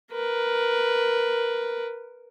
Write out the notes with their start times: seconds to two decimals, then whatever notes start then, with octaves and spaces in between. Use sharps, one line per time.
0.12 A#4 B4